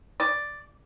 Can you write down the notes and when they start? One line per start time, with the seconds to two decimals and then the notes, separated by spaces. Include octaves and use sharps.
0.20 D5